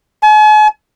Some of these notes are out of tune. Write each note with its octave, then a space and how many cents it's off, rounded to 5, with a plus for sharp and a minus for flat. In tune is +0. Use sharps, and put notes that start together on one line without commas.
G#5 +45